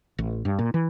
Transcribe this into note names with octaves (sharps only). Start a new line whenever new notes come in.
A1
G2
A#2
E3